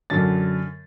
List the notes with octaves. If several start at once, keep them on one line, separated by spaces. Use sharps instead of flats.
F#2 D3 F#3 A6